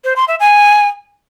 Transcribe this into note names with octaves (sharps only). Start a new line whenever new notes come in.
C5
C6
E5
G#5